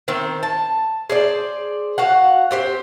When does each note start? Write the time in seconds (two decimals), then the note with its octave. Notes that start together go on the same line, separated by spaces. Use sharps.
0.08 D#3 C4
0.43 A5
1.10 G#4 C5 D5
1.98 F#4 F5 F#5
2.51 C4 G4 C5